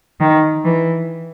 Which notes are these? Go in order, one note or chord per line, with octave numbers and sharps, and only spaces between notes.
D#3
E3